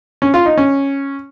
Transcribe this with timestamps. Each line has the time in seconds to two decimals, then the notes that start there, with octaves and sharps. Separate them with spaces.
0.22 C#4
0.34 F4
0.46 D#4
0.58 C#4